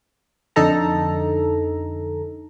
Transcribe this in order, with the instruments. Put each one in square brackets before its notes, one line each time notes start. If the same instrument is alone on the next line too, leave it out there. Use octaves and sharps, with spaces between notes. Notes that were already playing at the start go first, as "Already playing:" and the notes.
[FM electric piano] F2 D3 D#4 A4 A#5